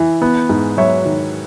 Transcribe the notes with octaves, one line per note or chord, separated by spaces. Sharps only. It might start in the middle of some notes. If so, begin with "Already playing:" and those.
Already playing: E3
B3
G#2
F#3 C#5 E5
D#3